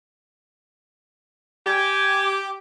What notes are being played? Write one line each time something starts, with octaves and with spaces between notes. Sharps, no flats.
G4 G#5